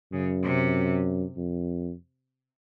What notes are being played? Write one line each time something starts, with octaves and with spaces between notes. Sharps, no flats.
F#2 C#3
C3
F2